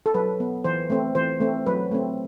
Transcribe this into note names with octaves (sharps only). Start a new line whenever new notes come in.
A4
F#3 B4
B3
E3 C5
A3 C4
E3 C5
A3 C4
F#3 B4
A3 C4